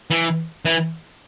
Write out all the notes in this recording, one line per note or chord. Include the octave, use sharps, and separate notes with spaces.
E3
E3